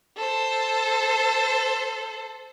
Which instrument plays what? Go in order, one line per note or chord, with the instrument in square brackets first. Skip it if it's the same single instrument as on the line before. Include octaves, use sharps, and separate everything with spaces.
[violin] A4 C5